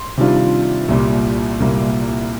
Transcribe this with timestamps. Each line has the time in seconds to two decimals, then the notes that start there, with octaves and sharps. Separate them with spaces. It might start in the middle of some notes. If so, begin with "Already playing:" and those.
Already playing: C6
0.18 C3 D#3 G3 D4 F4
0.89 C2 A#2 G3 A#3
1.60 C2 A#2 G3 A#3